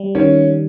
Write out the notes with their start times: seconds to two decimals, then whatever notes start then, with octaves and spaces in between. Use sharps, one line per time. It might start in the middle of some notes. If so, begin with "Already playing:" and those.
Already playing: G3
0.15 D#3 C#4